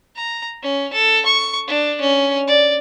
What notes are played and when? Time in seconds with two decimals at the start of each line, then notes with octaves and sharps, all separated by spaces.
0.16 A#5
0.63 C#4
0.93 A4
1.26 C#6
1.68 D4
2.01 C#4
2.48 D5